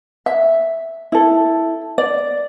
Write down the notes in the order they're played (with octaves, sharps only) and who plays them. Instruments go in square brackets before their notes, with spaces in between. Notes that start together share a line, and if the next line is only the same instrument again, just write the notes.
[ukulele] E5
E4 A4
D5